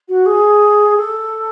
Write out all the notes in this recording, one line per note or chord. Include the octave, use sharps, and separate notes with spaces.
F#4
G#4
A4